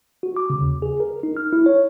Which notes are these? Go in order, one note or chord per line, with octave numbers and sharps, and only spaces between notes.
F#4
D6
C#3
D#2
G#4
A#4
D#4
F6
E4
C#5